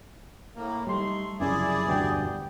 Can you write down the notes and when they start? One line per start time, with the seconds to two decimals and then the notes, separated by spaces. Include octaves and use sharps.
0.56 A2 A#3
0.87 G3 A3 D#4 C6
1.40 F1 F#2 C#3 E4 G#4 D5
1.87 E1 D2 G2 B3 G4 G5